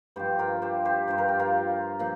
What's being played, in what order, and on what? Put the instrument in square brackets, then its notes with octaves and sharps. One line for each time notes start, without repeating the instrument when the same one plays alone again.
[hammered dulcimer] G2 F3 G4 C5
F4 A#4
G4 C5
G4 C5
G2 F3 C5
A#4
G4
F4 A#4
A#2 F3